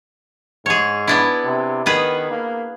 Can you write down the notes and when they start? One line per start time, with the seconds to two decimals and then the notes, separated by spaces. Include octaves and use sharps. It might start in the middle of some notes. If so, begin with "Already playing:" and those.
0.66 G#2 G#4 C#5
1.08 B3 D4 E4
1.45 C3
1.86 D#3 B3 G#4 B4
2.31 A#3